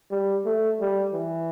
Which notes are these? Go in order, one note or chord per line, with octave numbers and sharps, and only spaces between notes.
G3
A3
G3
E3